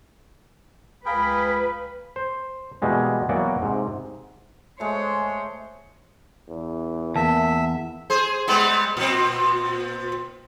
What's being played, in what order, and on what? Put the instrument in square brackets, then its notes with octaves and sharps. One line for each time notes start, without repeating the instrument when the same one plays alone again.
[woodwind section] C#2 F5 B5 [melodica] G#4 A#4 G5 [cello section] B4
[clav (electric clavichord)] C5
B2 E3 G3 G#3 A#3
E3 F#3 A#3 B3 F#4 D5
G#2 C3
[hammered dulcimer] G#3 A3 [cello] C5 C#5
[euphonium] E2
[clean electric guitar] E2 [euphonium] A#3 [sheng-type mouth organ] E5 [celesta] A5
[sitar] G#4 C5
G3 G#3 B3
A#2 C4